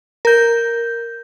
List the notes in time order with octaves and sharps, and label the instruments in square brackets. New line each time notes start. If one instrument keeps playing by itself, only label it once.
[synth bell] A#4 G6